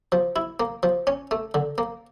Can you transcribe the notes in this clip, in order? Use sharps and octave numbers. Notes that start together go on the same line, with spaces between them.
F3
E4
A#3
F3
C#4
A3
D3
A#3